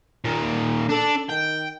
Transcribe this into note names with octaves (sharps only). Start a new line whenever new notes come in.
A#2 D#3
D4 A4
D#3 G5